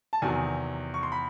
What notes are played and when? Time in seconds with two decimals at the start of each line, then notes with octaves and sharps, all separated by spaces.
0.13 A5
0.22 E2 C3 D#3 F#3 G#5
0.94 C#6
1.03 C6
1.12 B5